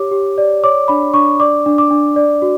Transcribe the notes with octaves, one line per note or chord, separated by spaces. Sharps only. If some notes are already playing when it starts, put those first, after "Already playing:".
Already playing: G4 C#5 D6
G4
D5
C#5 D6
D4 B5
D4 C#6
D5 D6
D4
D6
D4
D5
F#4